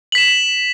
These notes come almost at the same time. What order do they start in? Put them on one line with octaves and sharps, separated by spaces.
F#7 B6 E7